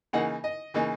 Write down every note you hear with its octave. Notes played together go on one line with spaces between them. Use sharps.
C#3 E3 A#3 D#4 F#5
D#5
C#3 E3 A#3 D#4